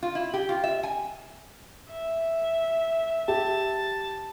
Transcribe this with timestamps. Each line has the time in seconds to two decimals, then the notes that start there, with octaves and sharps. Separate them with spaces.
0.03 F4
0.15 E4
0.34 G4
0.49 F4
0.64 E5
0.83 G#5
1.91 E5
3.28 G4 A5